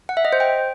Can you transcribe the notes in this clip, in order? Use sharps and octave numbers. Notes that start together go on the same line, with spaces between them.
F#5
E5
D#5
C5
G5